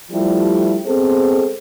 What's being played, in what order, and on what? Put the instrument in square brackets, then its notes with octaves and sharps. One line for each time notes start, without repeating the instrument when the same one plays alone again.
[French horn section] F3 G3 A3 D4 E4 G4
G#3 B3 C4 G#4 A4 C5